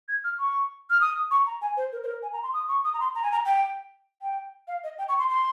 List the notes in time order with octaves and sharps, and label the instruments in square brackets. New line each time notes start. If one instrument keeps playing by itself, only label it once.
[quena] G#6
F6
C#6
F6
D#6
C#6
A#5
G#5
C5
A#4
C5
A#4
G#5
A#5
C6
D#6
C#6
D#6
A#5
C6
A#5
G#5
A#5
G5
G5
F5
D#5
G5
C#6
C6
C6